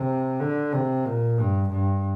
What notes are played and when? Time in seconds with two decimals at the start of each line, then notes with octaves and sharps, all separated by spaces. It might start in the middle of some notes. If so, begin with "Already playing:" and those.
Already playing: C3
0.40 D3
0.73 C3
1.05 A#2
1.38 G2
1.70 G2